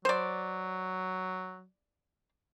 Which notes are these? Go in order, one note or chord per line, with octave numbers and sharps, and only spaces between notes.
F#3 C5 D5